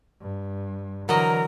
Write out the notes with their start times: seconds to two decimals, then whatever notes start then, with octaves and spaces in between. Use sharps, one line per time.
0.21 G2
1.09 D3 E3 F#3 A#4 D#5